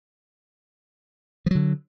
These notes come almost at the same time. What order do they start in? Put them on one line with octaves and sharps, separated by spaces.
F3 F#3 D3